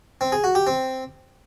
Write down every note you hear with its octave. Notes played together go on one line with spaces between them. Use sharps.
C4
G#4
F#4
G4
C4